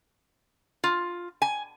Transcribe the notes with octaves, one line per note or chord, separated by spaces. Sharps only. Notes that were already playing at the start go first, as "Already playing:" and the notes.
F4
G#5